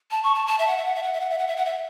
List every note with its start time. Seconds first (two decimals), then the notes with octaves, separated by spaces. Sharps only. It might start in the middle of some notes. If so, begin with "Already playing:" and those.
0.11 A5
0.24 C#6
0.35 A5
0.47 A5
0.59 E5
0.68 F#5
0.77 E5
0.85 F#5
0.95 E5
1.03 F#5
1.13 E5
1.21 F#5
1.30 E5
1.38 F#5
1.47 E5
1.56 F#5
1.66 E5